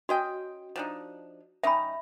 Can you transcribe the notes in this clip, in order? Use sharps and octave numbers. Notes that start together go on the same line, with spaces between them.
C#4 F#4 D#5 G5
F3 D4 D#4
G3 C#4 D#4 E5 B5